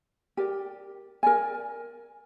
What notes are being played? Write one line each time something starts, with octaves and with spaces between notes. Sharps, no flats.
G4 A#4 D5
A#4 D5 G#5